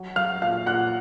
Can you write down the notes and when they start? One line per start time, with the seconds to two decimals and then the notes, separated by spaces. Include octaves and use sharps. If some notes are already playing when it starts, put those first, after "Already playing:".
Already playing: F#3
0.16 F#3 F5 F6
0.42 A#2 F5 F6
0.66 A#2 F#5 F#6